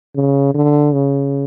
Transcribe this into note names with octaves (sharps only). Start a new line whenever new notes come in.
C#3
D3
C#3